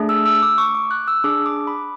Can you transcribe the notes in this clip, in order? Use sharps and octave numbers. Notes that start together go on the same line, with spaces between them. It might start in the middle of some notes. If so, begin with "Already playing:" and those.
Already playing: A3 D4 G#4
E6
E6
D6
C#6
D6
F#6
E6
D4 G#4 D6
D6
B5